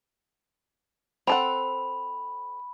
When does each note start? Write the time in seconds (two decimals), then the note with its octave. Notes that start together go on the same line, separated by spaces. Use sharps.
1.27 C4 A4 F#5 B5